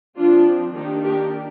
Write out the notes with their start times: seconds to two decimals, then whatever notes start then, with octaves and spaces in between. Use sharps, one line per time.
0.17 F3 C4 D4 F4
0.75 D#3 A#3 D4 D#4 G4
1.04 G4 A#4